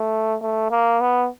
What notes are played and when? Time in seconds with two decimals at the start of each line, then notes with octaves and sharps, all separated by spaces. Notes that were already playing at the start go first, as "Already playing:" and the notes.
Already playing: A3
0.41 A3
0.71 A#3
1.01 B3